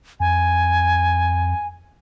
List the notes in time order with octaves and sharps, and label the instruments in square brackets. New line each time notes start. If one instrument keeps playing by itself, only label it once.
[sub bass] F2 [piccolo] G#5